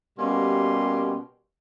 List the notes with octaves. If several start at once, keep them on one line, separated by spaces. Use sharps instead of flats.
B2 G3 A#3 C#4 G4 C6